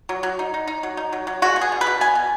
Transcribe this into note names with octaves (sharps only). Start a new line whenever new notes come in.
F#3
F#3
D#4
D#4
D#4
F#3
D#4
F#3
F#3
G#3 F#4
B2
G#4
B2
B4
B2
B3 G#5
B2